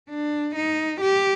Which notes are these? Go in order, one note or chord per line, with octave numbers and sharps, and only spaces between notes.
D4
D#4
G4